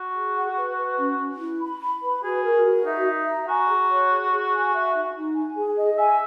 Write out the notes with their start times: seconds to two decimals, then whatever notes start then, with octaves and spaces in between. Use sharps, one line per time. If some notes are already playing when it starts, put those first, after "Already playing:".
Already playing: F#4
0.15 G#4
0.35 F#5
0.56 B4
0.77 B4
0.98 C#4
1.19 C#4
1.39 E4
1.61 B5
1.81 B5
2.02 B4
2.23 F#4 G#4
2.44 A#4
2.65 F#4
2.85 D#4 E5
3.06 E5
3.27 A#5
3.48 F#4 G#5
3.69 G#4
3.90 C#5
4.11 G#4
4.32 G#4
4.52 G#5
4.73 E5
4.94 D#4
5.14 D#4
5.35 G#5
5.57 G#4
5.77 D#5
5.98 E5 G#5